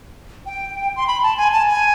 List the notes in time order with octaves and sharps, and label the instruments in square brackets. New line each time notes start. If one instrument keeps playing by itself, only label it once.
[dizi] G5
C6
B5
A5
G#5
A5
G#5